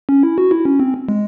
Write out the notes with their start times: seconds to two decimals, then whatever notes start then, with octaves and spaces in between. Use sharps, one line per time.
0.09 C#4
0.23 E4
0.38 F#4
0.51 E4
0.65 C#4
0.80 C4
1.09 G#3